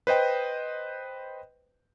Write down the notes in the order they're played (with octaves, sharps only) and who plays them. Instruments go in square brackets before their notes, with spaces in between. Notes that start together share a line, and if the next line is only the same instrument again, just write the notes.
[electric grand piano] B4 C5 D#5 G5